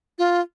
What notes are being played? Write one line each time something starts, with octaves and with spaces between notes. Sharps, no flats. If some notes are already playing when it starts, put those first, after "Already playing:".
F4